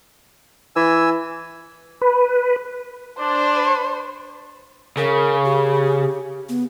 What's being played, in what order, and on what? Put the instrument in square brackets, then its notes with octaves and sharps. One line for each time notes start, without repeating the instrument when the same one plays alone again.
[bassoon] E3 [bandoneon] G#5 E6
[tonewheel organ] B4
[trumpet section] D4 [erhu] C5
[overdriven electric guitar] C#3 [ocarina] A#4
[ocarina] G4
B3